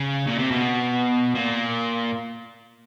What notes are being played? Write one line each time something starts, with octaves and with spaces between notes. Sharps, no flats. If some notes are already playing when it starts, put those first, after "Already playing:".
Already playing: C#3
A#2
C3
B2
A#2